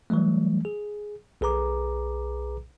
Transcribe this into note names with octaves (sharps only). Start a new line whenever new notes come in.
E3 F#3 G3 A3
G#4
B1 G#4 B4 A#5 D6